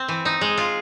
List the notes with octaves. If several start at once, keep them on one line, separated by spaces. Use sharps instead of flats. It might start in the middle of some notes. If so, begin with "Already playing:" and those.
Already playing: C4
E3
D#4
G#3
F4